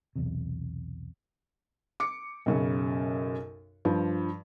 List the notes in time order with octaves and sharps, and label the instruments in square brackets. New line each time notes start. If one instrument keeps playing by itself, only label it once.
[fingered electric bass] B1 E2 C3
[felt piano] D6 C#7
B1 F#2 C#3
G2 F3